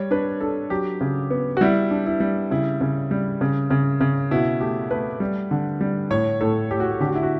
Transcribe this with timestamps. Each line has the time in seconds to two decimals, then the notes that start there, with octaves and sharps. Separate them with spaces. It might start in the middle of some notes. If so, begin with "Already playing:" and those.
Already playing: G3 C#5
0.11 D4 B4
0.41 D4 A4
0.70 F#3 G4
1.01 C#3
1.30 B3
1.57 F#4
1.61 G3 E4
1.91 D4
2.06 E4
2.20 G3
2.51 C#3 E4
2.81 C#3
3.11 G3
3.41 C#3
3.70 C#3
4.01 C#3
4.31 B2 E4
4.61 A3 G4
4.91 A3 B4
5.20 G3
5.51 D3
5.81 G3
6.10 A2 C#5
6.41 A2 A4
6.71 A2 G4
6.80 F#4
6.90 G4
7.00 D3 G4
7.08 F#4
7.15 E4
7.23 F#4